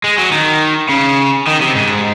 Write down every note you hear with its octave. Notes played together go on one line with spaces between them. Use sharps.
G#3
F#3
D#3
C#3
D#3
C3
G#2